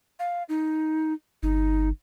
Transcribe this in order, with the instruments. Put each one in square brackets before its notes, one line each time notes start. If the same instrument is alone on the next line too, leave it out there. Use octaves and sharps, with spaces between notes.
[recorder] F5
D#4
[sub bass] G1 [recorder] D#4